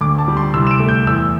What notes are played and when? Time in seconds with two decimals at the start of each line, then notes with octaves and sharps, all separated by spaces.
0.01 D2 D6
0.18 A5
0.28 G3
0.37 C6
0.54 C2 E6
0.67 E7
0.71 D7
0.80 A3
0.89 G6
1.06 E2 E6